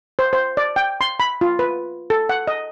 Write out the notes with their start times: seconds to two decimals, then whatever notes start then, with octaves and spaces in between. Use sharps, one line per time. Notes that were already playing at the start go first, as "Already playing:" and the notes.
0.19 C5
0.33 C5
0.57 D5
0.76 G5
1.01 C6
1.20 B5
1.41 F4
1.59 B4
2.10 A4
2.29 F#5
2.47 D#5